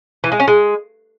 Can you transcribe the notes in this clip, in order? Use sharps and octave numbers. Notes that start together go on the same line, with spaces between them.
E3
G#3
C#4
G#3